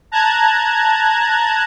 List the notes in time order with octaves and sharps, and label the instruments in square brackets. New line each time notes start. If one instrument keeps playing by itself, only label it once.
[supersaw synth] A5 A#5 F#6 G#6